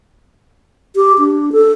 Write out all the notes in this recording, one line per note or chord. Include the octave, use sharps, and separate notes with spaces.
G4
D4
A4